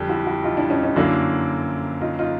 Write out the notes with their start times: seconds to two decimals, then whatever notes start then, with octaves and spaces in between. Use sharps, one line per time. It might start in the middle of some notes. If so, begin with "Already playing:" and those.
Already playing: F2 D3 G3
0.09 E4 F#4
0.26 E4 F#4
0.44 D#4 F4
0.57 D4 E4
0.70 C#4 D#4
0.83 C#4 D#4
0.96 F#2 D3 F#3 A#3 D4 E4
2.01 D#4 F4
2.19 D#4 F4